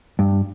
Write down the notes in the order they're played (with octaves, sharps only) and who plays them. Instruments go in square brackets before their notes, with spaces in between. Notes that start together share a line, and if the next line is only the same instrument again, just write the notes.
[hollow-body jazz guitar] G2